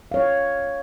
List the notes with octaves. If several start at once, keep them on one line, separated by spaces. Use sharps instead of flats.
C#5 F5